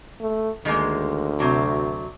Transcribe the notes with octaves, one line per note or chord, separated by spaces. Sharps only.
A3
D2 D#3 G#3 A#3
C3 F#3 D4